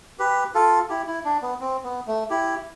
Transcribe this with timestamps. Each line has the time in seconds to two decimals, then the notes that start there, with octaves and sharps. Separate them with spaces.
0.19 G4 B4
0.54 F4 A4
0.90 E4 G4
1.07 E4
1.25 D4
1.42 B3
1.61 C4
1.84 B3
2.07 A3
2.30 E4 G4